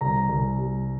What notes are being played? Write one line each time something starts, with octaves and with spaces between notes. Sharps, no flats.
C2 A#5
C2
G3